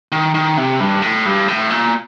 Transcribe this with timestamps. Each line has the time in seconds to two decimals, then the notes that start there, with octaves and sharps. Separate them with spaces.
0.12 D#3
0.34 D#3
0.58 C3
0.80 G2
1.02 A2
1.26 G2
1.48 A2
1.70 A#2